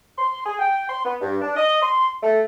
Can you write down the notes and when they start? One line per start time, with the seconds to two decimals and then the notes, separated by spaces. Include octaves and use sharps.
0.18 C6
0.46 G#4
0.59 G5
0.89 C6
1.05 B3
1.21 G2
1.42 D4
1.57 D#5
1.82 C6
2.23 A3